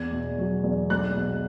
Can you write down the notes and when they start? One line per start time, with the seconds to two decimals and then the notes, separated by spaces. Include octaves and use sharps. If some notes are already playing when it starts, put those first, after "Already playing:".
Already playing: E2 G#6
0.12 B2
0.38 F#3
0.64 E2
0.90 B1 F#6
1.16 B2